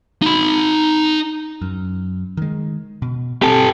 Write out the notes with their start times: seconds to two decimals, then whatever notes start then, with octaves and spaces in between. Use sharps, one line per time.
0.22 D#4 B5
1.62 F#2
2.37 D#3 G#3
3.02 B2
3.42 B2 C4 G4 A4